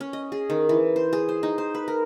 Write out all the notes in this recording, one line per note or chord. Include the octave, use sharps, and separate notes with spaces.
C#4
D#5
G#4
D#3
E3
C5
G#4
C5
D#4
C5
B4
A#4